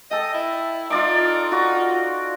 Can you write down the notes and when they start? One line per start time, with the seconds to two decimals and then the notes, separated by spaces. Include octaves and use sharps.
0.11 A4 D#5 G5
0.34 E4
0.90 D#4 F4 D5 D6
1.52 F4 F#4 D5